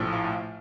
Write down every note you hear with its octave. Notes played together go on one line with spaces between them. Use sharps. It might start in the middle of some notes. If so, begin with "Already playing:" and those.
Already playing: A#1 A2 F3
F5